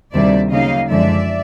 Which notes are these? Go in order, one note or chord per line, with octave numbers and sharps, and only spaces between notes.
D2 C3 D#3 G3 A#3 D5 E5
C#3 F#3 A#3 D#4 D#5 F5
F#2 D3 F3 G#3 D5 E5